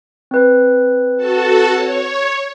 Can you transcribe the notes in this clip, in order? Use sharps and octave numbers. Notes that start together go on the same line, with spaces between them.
C4 B4
F#4 A4 A5
C#5